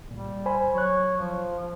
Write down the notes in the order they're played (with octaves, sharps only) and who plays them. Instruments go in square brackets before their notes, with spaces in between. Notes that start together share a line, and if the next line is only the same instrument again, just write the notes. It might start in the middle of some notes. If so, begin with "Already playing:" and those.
[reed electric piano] C#2 A#2 [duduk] G3
[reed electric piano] C5 G#5 B5
[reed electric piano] F#3 F#6 [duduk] C#5
[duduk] F3